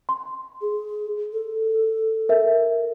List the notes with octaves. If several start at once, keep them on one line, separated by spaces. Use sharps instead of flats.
C6
G#4
A4
A#4 E5